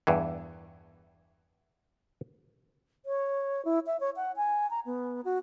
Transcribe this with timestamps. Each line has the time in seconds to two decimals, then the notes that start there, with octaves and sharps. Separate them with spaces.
0.07 E2 G2 E3
3.05 C#5
3.65 E4
3.87 E5
4.00 C#5
4.16 F#5
4.36 G#5
4.70 A#5
4.85 B3
5.24 F#4